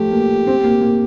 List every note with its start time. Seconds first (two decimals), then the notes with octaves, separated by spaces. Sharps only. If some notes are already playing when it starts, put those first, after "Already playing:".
Already playing: F3 A3 G4
0.12 A#3
0.47 C4
0.64 A#3
0.82 A#3